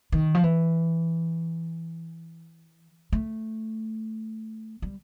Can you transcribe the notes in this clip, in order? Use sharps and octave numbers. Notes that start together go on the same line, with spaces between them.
D#3
F3
E3
A3
G3